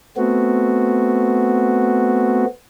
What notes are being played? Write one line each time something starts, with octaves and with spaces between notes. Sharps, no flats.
A3 B3 C4 F#4